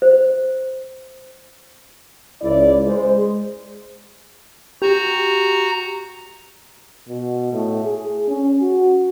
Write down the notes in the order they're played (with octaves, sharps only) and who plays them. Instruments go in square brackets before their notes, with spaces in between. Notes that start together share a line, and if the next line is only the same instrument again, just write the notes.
[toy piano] C5
[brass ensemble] C#2 E4 D5
G#3 C5
[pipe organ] F#4 A#5 [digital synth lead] G4
[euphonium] B2
A2
G#4
C#4
F#4